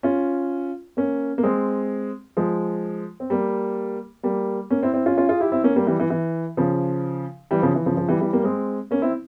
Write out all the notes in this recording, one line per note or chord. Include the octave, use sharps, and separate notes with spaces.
C#4 F4
A#3 C#4
A#3
G#3 C4
F3 G#3
C4
G3 A#3
G3 A#3
A#3 C#4
C4 E4
C4 E4
C#4 F4
C#4 F4
F4 G#4
E4 G4
C4 E4
A#3 C#4
G3 A#3
E3 G3
E3
E3
C#3 F3
E3 G3
C#3 F3
E3
C#3 F3
C#3 F3
E3 G3
E3 G3
G3 A#3
G#3 C4
A#3 C#4
C4 E4